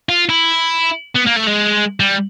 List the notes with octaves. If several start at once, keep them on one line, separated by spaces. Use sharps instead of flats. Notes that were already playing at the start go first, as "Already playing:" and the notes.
F4
E4
B3
A#3
A3
G#3
G3